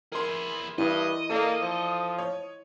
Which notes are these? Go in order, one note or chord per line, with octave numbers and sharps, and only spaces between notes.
E4 G#4 A#4 C6
G2 E4 D#5
A#3 A4 D5
F3
C#5